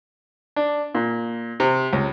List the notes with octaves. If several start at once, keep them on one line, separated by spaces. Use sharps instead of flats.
D4
A#2
C3
C#2